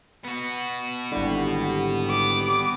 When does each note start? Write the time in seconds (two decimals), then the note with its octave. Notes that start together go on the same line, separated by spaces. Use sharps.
0.24 B3 F#4
1.12 G#1 D3 G3 E4 G4
2.10 D6